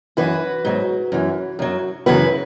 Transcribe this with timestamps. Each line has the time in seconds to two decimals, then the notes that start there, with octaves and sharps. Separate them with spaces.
0.17 F#2 E3 F#4 B4
0.65 G#2 F#3
1.12 F#2 E3
1.59 F#2 F#3
2.06 F#2 C#3 E3 F#4 B4